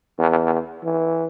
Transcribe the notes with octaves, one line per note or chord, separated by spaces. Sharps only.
E2
E3